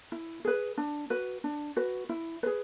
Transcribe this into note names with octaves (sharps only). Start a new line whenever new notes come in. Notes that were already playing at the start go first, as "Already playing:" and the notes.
E4
G#4 B4
D4
F#4 B4
D4
F#4 B4
E4
G#4 B4